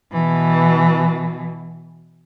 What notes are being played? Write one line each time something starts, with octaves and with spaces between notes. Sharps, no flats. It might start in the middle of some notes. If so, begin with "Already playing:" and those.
B2 E3